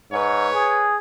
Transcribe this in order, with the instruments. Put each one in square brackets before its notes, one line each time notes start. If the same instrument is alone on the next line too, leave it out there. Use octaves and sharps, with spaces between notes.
[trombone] G#2 [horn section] B4 C#5
[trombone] G#4